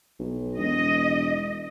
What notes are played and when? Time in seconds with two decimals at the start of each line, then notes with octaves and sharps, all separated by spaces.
0.19 B1
0.58 E1 D#5